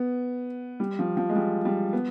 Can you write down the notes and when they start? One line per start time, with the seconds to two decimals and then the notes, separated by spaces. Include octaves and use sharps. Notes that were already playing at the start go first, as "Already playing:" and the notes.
Already playing: B3
0.80 G3
0.99 F3
1.17 F3
1.30 G#3
1.36 G3
1.65 G3
1.93 B3